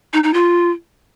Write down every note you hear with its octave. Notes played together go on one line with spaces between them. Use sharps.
D#4
D#4
F4